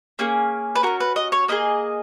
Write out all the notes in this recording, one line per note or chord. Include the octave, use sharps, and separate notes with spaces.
A#3 C#4 G#4
B4
C#4 F#4 A#4
B4
D#5
C#5
A#3 E4 G#4 D#5